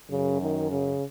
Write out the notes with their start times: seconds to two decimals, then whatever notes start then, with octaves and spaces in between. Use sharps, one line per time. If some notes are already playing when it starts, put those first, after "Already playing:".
0.10 F#2 C#3
0.42 D#3
0.72 C#3